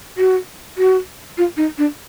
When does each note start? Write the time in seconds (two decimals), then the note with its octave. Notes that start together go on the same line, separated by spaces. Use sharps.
0.18 F#4
0.78 F#4
1.38 F4
1.57 D#4
1.78 D4